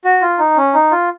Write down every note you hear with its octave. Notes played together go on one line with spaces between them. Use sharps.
F#4
F4
D#4
C#4
D#4
F4